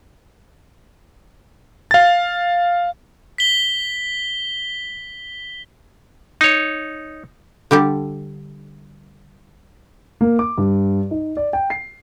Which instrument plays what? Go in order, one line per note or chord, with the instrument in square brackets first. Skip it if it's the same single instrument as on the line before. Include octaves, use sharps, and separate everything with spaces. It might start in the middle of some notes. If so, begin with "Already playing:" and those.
[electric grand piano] F5 A6
[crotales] B6 G7
[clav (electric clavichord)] D#4 C#5
[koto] D3 G3 G4 A4
[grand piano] A#3
D6
G2
D#4
D5
G5
C7